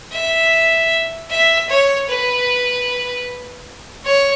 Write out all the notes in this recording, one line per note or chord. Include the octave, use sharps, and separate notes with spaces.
E5
E5
C#5
B4
C#5